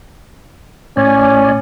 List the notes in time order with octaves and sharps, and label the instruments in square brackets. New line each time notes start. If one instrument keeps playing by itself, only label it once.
[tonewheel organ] A2 D5 G#5 [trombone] C#4